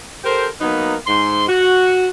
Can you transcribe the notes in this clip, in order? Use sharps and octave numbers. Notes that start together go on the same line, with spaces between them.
G4 A4 A#4 C5
F#3 A#3 B3 D#4 A#4 B4
G#2 C6
F#4